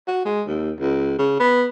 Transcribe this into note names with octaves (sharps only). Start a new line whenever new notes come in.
F#4
G#3
D#2
C#2
C#3
B3